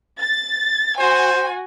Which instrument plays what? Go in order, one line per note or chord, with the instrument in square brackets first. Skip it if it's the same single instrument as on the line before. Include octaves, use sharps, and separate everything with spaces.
[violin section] A6
[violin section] F#4 G#5 [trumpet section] C5